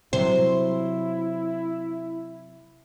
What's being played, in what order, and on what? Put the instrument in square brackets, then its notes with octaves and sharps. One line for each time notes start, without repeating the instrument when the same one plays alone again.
[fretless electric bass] C3 F#3 [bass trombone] E4 [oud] C5